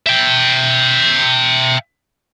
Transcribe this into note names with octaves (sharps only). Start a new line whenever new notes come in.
E5 G5